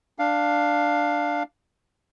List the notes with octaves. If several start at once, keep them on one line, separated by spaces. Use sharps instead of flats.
D4 F5